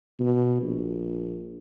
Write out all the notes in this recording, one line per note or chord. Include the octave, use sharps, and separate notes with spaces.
B2
A#1